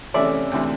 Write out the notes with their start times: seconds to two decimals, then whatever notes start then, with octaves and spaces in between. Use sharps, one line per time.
0.14 C3 E3 A3 C#4 D5 E5
0.51 D2 C3 E3